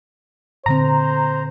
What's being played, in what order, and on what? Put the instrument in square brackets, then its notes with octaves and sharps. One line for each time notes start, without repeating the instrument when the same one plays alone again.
[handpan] A#2 D3 C4 [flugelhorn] C5 [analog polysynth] A#5